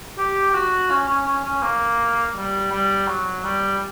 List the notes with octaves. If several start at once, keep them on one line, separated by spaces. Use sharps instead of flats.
G4
G4
F#4
C#4
C#4
C#4
C#4
A#3
G3
G3
F#3
G3